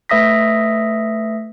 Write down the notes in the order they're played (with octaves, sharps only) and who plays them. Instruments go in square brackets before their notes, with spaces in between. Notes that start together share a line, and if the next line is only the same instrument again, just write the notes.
[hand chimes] A3 B4 E5 D#6 A#6 B6